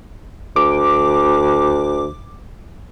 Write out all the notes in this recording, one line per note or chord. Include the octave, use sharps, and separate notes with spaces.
D2 D6